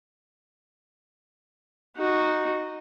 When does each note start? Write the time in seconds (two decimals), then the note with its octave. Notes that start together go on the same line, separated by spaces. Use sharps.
1.97 D#4 F#4